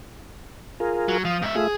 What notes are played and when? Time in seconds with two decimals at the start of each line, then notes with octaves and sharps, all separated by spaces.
0.80 F4 G#4 A#4
1.08 F#3
1.25 F3 F5 D#6
1.42 G#2 E5
1.56 A3 F4 G#4 E5